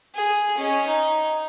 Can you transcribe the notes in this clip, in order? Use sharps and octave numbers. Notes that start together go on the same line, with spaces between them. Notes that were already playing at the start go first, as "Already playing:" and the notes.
G#4
C#4 D#5
D#4